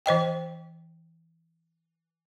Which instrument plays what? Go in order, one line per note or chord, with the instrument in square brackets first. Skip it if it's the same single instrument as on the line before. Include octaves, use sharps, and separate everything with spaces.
[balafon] E3 C5 D#5 G5